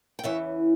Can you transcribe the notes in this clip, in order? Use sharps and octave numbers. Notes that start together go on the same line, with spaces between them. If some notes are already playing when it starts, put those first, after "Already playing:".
G5
E2 C#3 E3 C#5 E5